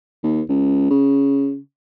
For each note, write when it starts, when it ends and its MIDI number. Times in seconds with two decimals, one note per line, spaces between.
0.24 0.41 39
0.49 0.90 37
0.90 1.57 49